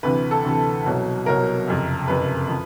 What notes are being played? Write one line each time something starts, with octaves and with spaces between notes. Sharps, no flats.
D2 C3 E3 B4
A4
D2 C3 E3
C2 B2 F#3
C2 B2 F#3 A#4
F#1 F2 C3
F#1 F2 C3 B4
F3